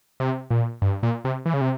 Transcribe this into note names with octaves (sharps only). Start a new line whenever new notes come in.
C3
A#2
G2
A#2
C3
E3
C#3
C3